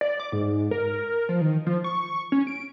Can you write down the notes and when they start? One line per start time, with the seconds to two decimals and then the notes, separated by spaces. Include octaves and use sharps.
0.01 D5
0.20 D6
0.32 G#2
0.71 A#4
1.29 F3
1.41 D#3
1.67 F3
1.84 C#6
2.32 C#4
2.47 D7